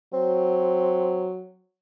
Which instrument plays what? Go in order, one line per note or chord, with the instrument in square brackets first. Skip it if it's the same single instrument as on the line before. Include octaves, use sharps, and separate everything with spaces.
[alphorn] F#3 [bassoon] C4